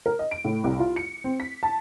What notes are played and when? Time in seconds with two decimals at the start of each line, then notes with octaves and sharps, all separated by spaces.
0.06 A#4
0.19 D#5
0.31 D7
0.45 A2
0.64 C2
0.79 F4
0.96 C#7
1.24 C4
1.40 B6
1.63 A5